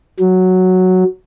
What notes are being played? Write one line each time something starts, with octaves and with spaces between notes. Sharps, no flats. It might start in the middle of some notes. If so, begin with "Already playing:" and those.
F#3